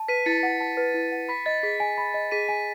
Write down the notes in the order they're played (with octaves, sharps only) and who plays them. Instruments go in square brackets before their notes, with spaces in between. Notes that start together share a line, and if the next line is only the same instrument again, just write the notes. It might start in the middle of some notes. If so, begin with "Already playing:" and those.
Already playing: [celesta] A5
[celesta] B4 [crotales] B6 D#7
[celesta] E4 [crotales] A6 C#7
[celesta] F#5
A5
B4
E4
F#5
[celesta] B5 [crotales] B6
[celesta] D#5 [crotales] A6
[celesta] G#4 [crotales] B6
[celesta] G#5
B5
D#5
[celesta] G#4 [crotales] B6 D#7
[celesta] G#5